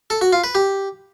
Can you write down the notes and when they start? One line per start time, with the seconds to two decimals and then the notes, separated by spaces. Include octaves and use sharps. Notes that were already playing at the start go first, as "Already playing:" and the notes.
0.10 A4
0.21 F#4
0.33 F4
0.44 B4
0.55 G4